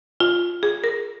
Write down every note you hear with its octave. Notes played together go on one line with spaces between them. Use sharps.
F4
G#4
A#4